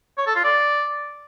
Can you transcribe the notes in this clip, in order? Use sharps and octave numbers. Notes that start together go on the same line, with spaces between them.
C#5
A4
F4
D5